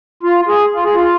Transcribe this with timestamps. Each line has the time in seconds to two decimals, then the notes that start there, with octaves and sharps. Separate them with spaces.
0.23 F4
0.48 G#4
0.74 F4
0.85 G#4
0.95 F4